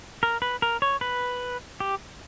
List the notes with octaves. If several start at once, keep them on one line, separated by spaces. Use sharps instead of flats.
A#4
B4
A#4
C#5
B4
G4